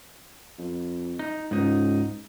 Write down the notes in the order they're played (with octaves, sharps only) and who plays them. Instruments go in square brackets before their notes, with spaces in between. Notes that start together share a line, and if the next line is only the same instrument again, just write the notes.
[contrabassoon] F2
[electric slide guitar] D#4
[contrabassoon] C#2 [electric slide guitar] G#2 D#4